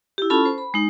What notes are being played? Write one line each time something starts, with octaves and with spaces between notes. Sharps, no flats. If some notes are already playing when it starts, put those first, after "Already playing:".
E4 G4
C#4 F4 A4 A5 B5
C5
B5
G#3 D#4